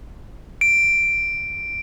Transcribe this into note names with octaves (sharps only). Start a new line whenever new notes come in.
D7